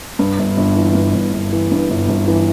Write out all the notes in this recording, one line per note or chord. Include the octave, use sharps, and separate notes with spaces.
G2
G1
G1
E3
G2
G1
G1
E3
G2
G1
G1
E3